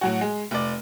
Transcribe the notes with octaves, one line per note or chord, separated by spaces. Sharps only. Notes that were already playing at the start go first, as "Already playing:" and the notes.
A2 F#3 F#4
G#3
F1 D5